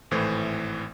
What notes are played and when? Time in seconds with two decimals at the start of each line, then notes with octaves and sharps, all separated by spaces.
0.11 G#1 A2 E3 A3 C5 G#6